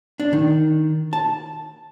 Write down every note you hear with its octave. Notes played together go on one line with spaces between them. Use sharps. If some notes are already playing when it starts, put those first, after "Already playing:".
D4
D#3
A5